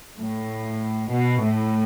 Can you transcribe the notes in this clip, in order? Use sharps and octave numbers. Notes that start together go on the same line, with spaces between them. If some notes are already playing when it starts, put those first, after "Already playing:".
A2
B2
A2